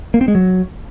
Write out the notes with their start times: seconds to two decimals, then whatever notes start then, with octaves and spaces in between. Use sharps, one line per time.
0.14 A#3
0.21 C4
0.28 G#3
0.35 F#3